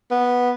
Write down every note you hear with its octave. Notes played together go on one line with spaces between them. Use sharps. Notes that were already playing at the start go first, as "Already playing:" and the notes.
B3